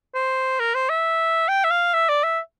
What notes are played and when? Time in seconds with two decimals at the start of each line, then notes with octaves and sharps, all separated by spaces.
0.15 C5
0.60 A#4
0.75 C5
0.89 E5
1.48 G5
1.64 E5
1.71 F5
1.94 E5
2.09 D5
2.24 E5